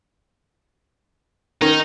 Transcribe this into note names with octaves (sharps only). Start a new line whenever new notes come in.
D#3 C#4 D#4